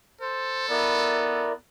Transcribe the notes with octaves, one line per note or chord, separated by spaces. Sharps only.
A4 C5
B3 E4 A#4 D5